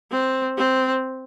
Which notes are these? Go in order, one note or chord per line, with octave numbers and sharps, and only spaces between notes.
C4
C4